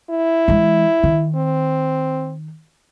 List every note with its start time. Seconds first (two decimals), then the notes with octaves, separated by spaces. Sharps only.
0.10 E4
0.48 E3 G#3
1.03 D#3
1.36 C4